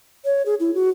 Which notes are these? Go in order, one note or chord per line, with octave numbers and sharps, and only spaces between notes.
C#5
G#4
E4
F#4